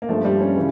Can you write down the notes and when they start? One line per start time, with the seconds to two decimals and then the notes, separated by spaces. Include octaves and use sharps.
0.02 A#3
0.09 G2 F3 A3
0.25 G3
0.40 C#4
0.56 C#3 E3